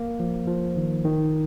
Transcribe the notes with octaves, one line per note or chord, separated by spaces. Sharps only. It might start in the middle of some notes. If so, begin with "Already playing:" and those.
Already playing: A#3
F3
F3
D#3
D#3